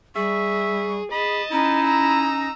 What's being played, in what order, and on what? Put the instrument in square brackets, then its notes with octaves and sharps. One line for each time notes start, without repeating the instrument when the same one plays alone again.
[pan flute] G3 [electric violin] G#4 [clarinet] E5 [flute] C#6
[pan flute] G#4 [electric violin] D#5 A5 [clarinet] B5
[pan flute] C#4 [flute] D#4 [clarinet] E4
[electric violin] A#5 E6